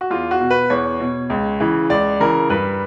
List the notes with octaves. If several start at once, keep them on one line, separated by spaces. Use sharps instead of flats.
F#4
E2 F4
F#4
B2
B4
E2 C#5
B2
C#2
C#3 E3
C#2 D5
C#3 E3 A#4
G2 B4